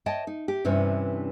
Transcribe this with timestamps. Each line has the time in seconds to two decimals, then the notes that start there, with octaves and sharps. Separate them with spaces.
0.06 C#5 D#5 G5 A5
0.27 D#4
0.48 G4
0.65 G2 C3 E3 C#4 D4